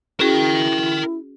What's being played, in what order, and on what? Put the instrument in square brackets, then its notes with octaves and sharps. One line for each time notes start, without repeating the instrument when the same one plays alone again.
[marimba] C#4 F#4 G#4 [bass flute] E4 [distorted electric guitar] A#4 G5